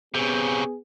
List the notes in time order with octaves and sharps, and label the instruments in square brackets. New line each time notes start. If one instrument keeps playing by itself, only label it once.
[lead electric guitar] C3 C#4 [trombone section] B3 G#4